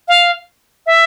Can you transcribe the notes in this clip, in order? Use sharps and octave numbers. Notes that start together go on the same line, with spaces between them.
F5
E5